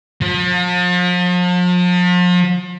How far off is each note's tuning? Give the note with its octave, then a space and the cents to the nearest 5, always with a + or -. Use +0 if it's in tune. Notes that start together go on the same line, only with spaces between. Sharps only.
F3 +40